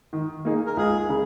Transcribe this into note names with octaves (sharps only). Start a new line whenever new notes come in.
D#3
A#3 D#4 G#4
A#4
C#2 G#4
C#3